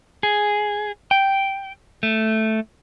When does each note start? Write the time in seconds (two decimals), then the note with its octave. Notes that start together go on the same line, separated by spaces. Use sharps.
0.23 G#4
1.11 G5
2.03 A3